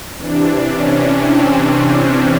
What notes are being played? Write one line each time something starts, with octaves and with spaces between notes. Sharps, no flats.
C3 E3 D4
C#4
C4
C#4